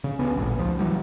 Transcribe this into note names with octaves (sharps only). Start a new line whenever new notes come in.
C#3
D2 C#3 B3 C#4
A1 D2 G2 A#2
C#2 F3
E3 F#3 G3